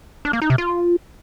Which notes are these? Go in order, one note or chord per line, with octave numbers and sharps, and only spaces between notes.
D4
A#3
D#4
C3
F4